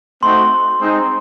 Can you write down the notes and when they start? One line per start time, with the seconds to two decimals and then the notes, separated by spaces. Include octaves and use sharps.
0.23 A3 C4 D#4 F#4 C6
0.79 G#3 C4 D#4